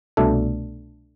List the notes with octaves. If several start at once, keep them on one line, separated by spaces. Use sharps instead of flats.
C2 B2 A3 D4 A4